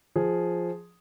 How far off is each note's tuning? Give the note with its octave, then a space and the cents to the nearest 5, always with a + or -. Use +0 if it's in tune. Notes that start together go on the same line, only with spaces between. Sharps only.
F3 +0 G#4 +0